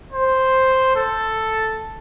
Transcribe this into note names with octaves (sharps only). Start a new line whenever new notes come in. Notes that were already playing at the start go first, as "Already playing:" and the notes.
C5
A4